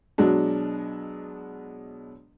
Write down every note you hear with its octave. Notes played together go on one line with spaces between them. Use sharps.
B2 F#3 G#3 D4